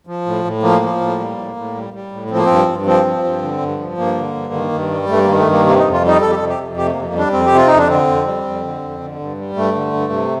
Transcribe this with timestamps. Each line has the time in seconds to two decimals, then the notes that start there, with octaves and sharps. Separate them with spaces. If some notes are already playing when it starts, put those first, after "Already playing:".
0.07 F3
0.26 A2
0.44 A2
0.62 F3 A#3
0.82 F3
1.01 A2
1.19 G3
1.37 A2
1.56 A2
1.74 G3
1.94 G3
2.12 A2
2.30 F3 C4
2.37 A#3
2.45 G2 C4
2.68 G2
2.86 F3 C4
3.05 F3
3.24 G2
3.42 D3
3.61 G2
3.79 F3
3.97 G2 A#3
4.16 D3
4.35 G2
4.54 D#3
4.72 G2
4.91 G3
5.09 G2 A3
5.23 A#3
5.28 D#3
5.38 A3
5.47 G2
5.52 A#3
5.65 C3 A#3
5.79 D#4
5.84 F2
5.93 F4
6.03 G3 D#4
6.21 F2 A4
6.30 G4
6.35 A4
6.40 C3
6.49 G4
6.58 F2
6.77 C3 G4
6.86 A3
6.91 F2 A#3
7.05 A#3
7.14 G3 D4
7.32 F2 C4
7.46 C3 G4
7.57 F4
7.67 F2 D#4
7.78 D4
7.89 D3 C4
8.08 F2
8.25 G3
8.44 F2
8.63 D3
8.81 F2
9.00 D3
9.19 G2
9.38 G3
9.56 G2 A3
9.75 D3
9.93 G2
10.12 C3